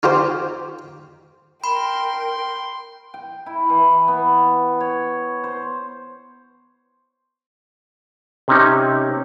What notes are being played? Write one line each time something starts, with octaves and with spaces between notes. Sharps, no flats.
D#4 F4 G4 C5
A#4 G5 B5 C6
G5
E4
E3
B3
C#5
C5
C3 C4 C#4 D#4